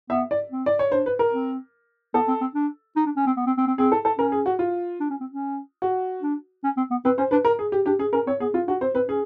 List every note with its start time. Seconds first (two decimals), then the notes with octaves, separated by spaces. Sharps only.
0.10 B3 E5
0.31 D5
0.52 C4
0.66 D5
0.79 C#5
0.92 D4 C5
1.06 B4
1.19 A#4
1.33 C4
2.14 B3 A4
2.28 C4
2.41 C4
2.55 D4
2.96 D#4
3.06 D4
3.17 C#4
3.26 C4
3.37 B3
3.46 C4
3.58 C4
3.68 C4
3.78 C4 G#4
3.92 A4
4.05 A4
4.19 C#4 A#4
4.32 G#4
4.46 F#4
4.59 F4
5.00 D4
5.10 C#4
5.21 C4
5.31 C#4
5.82 F#4
6.22 D4
6.64 C#4
6.77 C4
6.91 B3
7.05 C4 B4
7.18 C#4 C5
7.31 D4 B4
7.45 A#4
7.59 G#4
7.72 G4
7.86 D4 G4
7.99 C#4 G#4
8.13 C#4 A#4
8.27 C4 C#5
8.40 B3 G#4
8.54 C4 F4
8.67 D4 F#4
8.81 C4 C5
8.95 C4 B4
9.08 C#4 G#4